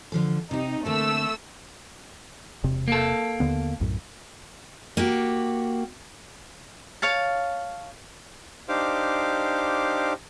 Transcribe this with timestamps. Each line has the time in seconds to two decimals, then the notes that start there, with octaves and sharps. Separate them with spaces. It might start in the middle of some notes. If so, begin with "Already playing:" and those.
0.12 D3 F3 A4
0.51 C3 D#4 G4
0.85 D3 A3 A#3 C4 E6
2.64 E1 C3
2.88 A#3 A4
3.40 D#2 D3 B3
3.81 B1 F#2 A2
4.97 A#3 F#4 G4
7.02 C#5 F5 A5
8.69 D4 D#4 G4 C5 F5 D6